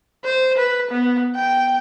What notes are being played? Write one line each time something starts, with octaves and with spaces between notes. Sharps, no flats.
C5
B4
B3
G5